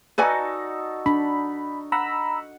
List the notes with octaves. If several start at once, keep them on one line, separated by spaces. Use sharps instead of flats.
D#4 F#4 A4 B4 D5 G#5
D4 B5
F#5 A#5 B5 E6